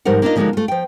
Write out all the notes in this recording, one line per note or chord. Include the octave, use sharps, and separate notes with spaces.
G#2 F3 G3 A#4 F#5
A#3 C4 D4 D#4 F4 D#5
D3 F3 G#3 A#3 D#4 F#4
A3 F4
F3 G5